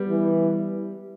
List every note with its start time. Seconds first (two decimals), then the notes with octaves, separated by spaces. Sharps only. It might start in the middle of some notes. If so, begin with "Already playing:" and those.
Already playing: G3 B3
0.09 E3